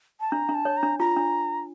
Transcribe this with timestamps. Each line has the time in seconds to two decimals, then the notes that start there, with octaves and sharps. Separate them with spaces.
0.20 A5
0.31 D4 A#5
0.49 D4
0.54 A5
0.65 C#5
0.77 A#5
0.83 D4
0.99 F4 A#5
1.16 D4